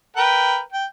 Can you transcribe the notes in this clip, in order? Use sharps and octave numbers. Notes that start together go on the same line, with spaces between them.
A#4 B4 G5
G5